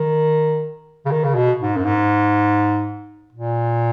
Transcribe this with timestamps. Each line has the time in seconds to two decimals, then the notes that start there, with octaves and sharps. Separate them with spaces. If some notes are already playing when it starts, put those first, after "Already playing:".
Already playing: D#3
1.05 C#3
1.11 D#3
1.24 C#3
1.35 B2
1.60 G#2
1.76 F#2
1.84 G#2
3.32 A#2